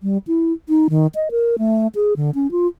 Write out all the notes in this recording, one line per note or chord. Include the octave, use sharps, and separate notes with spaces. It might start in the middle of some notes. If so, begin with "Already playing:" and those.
G3
E4
D#4
D#3
D#5
A#4
A3
G#4
D3
C#4
F4